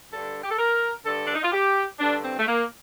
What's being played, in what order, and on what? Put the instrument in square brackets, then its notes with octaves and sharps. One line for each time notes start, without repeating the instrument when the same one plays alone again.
[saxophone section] G2 D3 A4
G4
A4
A#4
G2 D3 A4
D4
D#4
F4
G4
G2 D3 D4
C4
A3
A#3